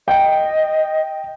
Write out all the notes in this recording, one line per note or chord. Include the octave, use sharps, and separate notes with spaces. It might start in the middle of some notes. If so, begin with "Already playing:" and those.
D#5 G5